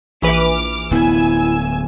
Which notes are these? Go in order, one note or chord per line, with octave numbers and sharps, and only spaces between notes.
A#1 E3 B4 D6 F6
D1 B3 E4 G#5 E6